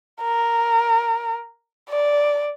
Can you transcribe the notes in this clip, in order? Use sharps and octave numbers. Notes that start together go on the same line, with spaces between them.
A#4
D5